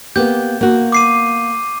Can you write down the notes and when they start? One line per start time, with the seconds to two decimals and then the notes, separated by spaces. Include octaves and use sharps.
0.16 A#3 B3 G4 G6
0.61 A#3 F#4
0.92 D6 C7 D#7